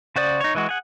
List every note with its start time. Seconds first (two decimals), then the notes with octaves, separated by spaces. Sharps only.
0.16 C#3 F#4 C5 D5 D#6
0.40 D#4 C#5
0.55 E3 G#3 F#4
0.69 G#4 F#5